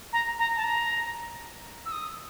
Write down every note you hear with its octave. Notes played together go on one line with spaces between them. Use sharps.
A#5
A#5
A5
A#5
E6
D#6